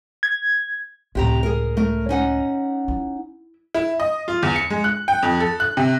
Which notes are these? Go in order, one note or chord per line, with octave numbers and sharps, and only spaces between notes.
G#6
C#2 A2 C3 G4 A#5
G#4 A#4
A3 A#4
C#4 D#4 F#5
E4
E4
D#5
F4
E2
C#7
G#3
F#6
G5
F2
A4
F#6
C3